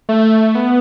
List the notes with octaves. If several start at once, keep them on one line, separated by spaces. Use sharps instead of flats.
A3
B3